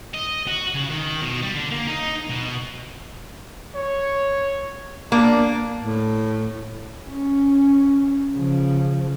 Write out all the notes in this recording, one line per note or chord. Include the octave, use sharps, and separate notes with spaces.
D#5
F#4
C#3
D#3
B2
G3
D3
A#3
D#4
B2
C#5
A#3 D4
A2
C#4
C#3 F3